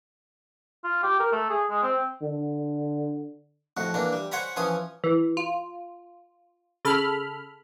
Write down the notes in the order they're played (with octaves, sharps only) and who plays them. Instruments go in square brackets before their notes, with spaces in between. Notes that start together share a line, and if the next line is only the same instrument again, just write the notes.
[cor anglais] F4
G4
A#4
A3
G#4
G#3
C4
[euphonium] D3
[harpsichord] F2 A2 F#4
E3 A#3 D4
G3
C5 C#5 F#5 G#5 A#5 B5
E3 F3 C#4 G#5 D#6
[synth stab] E3
F4
C#3 A4 B5 F6